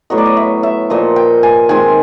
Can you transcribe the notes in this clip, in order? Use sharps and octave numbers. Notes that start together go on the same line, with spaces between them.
A2 F#3 B3 D#5
D5
D#5
E5
E5
A#2 F3 A#3 D#5
G5
G#5
D#3 G#3 C4 G#5